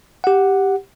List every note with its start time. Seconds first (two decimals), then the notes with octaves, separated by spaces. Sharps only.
0.24 G4 F#5